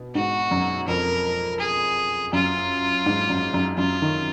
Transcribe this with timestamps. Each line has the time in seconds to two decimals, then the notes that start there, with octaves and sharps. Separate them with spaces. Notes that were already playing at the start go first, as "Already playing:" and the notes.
Already playing: B2
0.15 G#2 F#4
0.51 F#2
0.88 F2 A#4
1.60 G#4
2.33 F#2 F4
3.06 G#2
3.29 F#2
3.54 F#2
3.78 F#2 F4
4.02 D#3